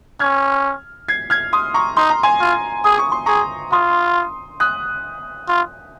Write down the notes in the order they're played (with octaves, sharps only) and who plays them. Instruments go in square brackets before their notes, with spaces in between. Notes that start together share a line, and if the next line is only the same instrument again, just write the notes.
[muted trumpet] C#4 [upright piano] F6 G#6
[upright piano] G#6 C7
F6 G#6
C6 D#6
A#5 C#6
[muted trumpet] D#4 [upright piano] C6
[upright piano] A#5
G#5 C6
[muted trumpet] F4
[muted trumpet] G#4 [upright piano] D#6
[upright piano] C#6
C6
[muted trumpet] G#4 [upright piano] A#5 C#6
[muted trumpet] F4 [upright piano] C6 D#6
[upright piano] D#6 F#6
[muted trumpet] F4